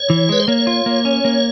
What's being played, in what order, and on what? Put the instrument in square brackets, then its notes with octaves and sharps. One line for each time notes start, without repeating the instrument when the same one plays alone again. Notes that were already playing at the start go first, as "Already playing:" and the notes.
Already playing: [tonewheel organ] C#5
[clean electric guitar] E3
[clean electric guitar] G#3 [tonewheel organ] B4
[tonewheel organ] C5
[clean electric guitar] A#3 [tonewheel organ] C#5
[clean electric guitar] F4
A#3
C#4
A#3